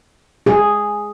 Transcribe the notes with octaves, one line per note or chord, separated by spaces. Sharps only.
G#4